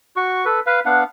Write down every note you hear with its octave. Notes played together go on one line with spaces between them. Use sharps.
F#4 C#6
A4 B4
B4 F5
B3 D4 F5 F#5